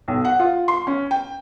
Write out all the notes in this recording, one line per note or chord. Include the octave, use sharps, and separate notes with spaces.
B1
F#5
F4
C6
C#4
G5